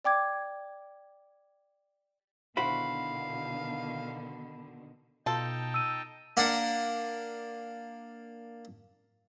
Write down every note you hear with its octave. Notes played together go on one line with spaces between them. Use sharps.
D5 G5 D6 G#6
B2 D3 D#3 E4 F#4 C5 F5 B5
B2 D#4 F4 A4 G5 A5
E6 D#7
A#3 D4 F#5